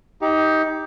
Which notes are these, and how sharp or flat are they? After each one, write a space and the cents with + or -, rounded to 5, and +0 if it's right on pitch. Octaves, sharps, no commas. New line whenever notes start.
D#4 +20 G4 +5